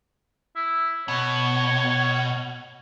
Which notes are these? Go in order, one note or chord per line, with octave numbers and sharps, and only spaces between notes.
E4
B2 C#5